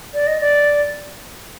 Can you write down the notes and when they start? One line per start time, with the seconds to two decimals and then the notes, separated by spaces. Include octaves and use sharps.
0.14 D5
0.27 D#5
0.41 D5